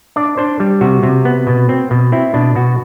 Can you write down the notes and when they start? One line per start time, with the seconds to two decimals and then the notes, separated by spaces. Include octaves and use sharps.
0.16 D4 D5
0.38 D4 C5
0.60 G3
0.81 C3 F#4
1.03 C3
1.25 B3
1.47 B2
1.69 C4
1.91 B2
2.12 C4 E4
2.34 B2 D4
2.56 B2 F#4